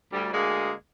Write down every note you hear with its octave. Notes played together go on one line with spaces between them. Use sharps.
D2 G3
D2 G#3 A#3 G#4 D5